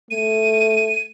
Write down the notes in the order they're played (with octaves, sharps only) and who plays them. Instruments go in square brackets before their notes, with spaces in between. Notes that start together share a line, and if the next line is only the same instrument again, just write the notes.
[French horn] A3 [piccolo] D#7